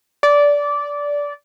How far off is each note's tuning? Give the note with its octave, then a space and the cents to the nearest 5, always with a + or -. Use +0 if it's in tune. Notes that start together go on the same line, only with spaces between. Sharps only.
D5 -15